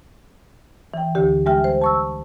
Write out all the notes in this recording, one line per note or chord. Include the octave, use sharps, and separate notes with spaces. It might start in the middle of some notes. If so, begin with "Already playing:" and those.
E3 G5
D2 D3 G4
G3 G#3 G4 E5 G5 F6
C5
A5 C#6 E6